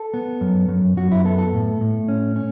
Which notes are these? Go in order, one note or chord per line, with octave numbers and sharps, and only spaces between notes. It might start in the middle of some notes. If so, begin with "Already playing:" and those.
Already playing: A4
B3
F#2
F#2
F#2 F#4
E4
B3 A4
A4
A2
A2
C#4
C#4